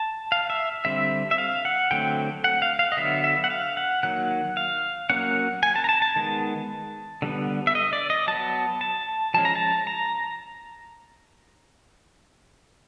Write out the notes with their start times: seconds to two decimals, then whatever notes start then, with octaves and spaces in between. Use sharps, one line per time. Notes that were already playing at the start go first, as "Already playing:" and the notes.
Already playing: A5
0.32 F5
0.50 E5
0.85 D3 G3 C4 E5
1.31 E5
1.38 F5
1.65 F#5
1.91 D3 F#3 A3 C4 G5
2.44 F#5
2.62 F5
2.79 F5
2.92 D#5
2.97 D3 F#3 B3 E5
3.24 E5
3.44 F#5
3.50 F5
3.77 F#5
4.03 D#3 F#3 A#3 F#5
4.57 F5
5.10 F#3 A#3 C#4 F#5
5.63 G#5
5.76 A5
5.84 A#5
5.89 A5
6.02 A5
6.16 D#3 G#3 B3
7.22 D3 G3 B3
7.67 E5
7.75 D#5
7.93 D5
8.10 D#5
8.27 F#3 B3 A5
8.81 A5
9.34 F3 G#3 C#4 A5
9.45 A#5
9.56 A5
9.87 A#5